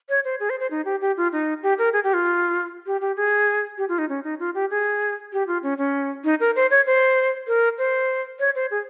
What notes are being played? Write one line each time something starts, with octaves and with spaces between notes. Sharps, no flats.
C#5
C5
G#4
C5
C5
D#4
G4
G4
F4
D#4
G4
A#4
G#4
G4
F4
G4
G4
G#4
G4
F4
D#4
C#4
D#4
F4
G4
G#4
G4
F4
C#4
C#4
D#4
A#4
C5
C#5
C5
A#4
C5
C#5
C5
G#4